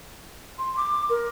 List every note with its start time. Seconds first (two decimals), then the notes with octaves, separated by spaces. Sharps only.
0.59 C6
0.77 D6
1.10 A#4